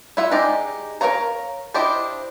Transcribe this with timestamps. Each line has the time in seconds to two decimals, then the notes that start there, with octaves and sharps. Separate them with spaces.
0.17 E4 F4 E5 F#5
0.31 G#3 D#4 G4 D5
1.01 A#4 C5 C#5 F5 A#5
1.74 D4 E4 G4 C5 D#5